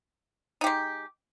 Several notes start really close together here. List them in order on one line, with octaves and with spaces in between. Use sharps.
D#4 G4 G#3